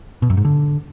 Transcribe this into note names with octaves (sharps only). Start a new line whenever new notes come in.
B2
F#2
G#2
D3